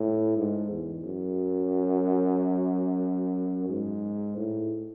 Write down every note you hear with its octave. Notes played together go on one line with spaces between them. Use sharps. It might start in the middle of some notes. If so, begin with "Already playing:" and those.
Already playing: A2
G#2
E2
F#2
G#2
A2